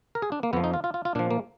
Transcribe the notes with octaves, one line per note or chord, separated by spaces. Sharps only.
A#4
G#4
D4
A#3
F2 F3 B3
D#4
F4
F4
F4
F4
A#2 F3 D4
A#3